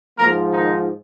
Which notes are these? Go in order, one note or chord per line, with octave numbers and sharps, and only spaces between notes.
G#2 F3 A#3 A#4
D#3 D#4